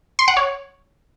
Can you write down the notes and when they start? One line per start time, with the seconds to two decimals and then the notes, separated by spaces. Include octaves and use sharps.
0.19 C6
0.28 F#5
0.37 C#5